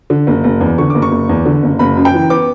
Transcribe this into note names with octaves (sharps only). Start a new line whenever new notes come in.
D3
F#1
F#1
E2
D3 C#6
F#1 D6
C#6
F#1
E2
D3
F#1
F#1 B5
F#2
G5
E3
B3 D6